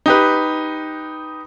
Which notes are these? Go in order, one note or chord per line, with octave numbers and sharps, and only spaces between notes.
D#4 G4 B4